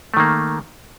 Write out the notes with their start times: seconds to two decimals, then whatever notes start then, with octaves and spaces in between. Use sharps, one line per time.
0.14 A3
0.17 D#3
0.20 A#3